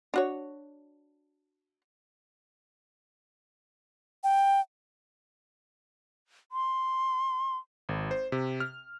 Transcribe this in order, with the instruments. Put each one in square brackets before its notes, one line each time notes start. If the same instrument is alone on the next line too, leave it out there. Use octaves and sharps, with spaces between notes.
[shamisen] D4 F#4 C#5
[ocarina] G5
[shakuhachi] C6
[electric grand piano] G#1
C5
C3
F6